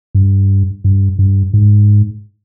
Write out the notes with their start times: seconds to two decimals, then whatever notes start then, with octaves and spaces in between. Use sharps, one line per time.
0.15 G2
0.84 G2
1.19 G2
1.53 G#2